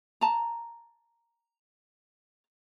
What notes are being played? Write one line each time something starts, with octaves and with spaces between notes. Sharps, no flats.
A5 A#5